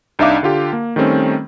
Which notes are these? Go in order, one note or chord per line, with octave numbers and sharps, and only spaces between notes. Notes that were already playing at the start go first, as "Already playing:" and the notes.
C2 D4 D#4 E5 F5 D6
D3 F4 G4
A#3
D#3 G3 A3 C4 C#4